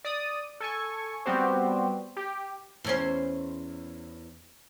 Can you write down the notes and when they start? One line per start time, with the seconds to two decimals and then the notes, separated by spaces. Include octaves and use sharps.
0.05 D5 D#6
0.60 A4 G#5 C#6
1.26 G3 B3 C4 F#4 G4 C5
2.17 G4
2.84 E2 C#4 C5